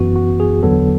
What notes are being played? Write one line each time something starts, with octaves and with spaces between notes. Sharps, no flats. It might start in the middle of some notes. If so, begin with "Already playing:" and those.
Already playing: F#2 E3 B3 F#4
F#4
G#4
E2 D3 F#3 B3 A4